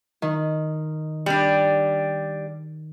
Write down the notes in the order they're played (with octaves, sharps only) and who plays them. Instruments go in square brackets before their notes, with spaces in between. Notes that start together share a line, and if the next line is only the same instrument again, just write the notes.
[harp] D#3
[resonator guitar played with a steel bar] G3 D4